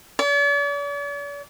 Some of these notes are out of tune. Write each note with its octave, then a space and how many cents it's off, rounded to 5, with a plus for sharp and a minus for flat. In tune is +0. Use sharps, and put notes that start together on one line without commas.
D5 -45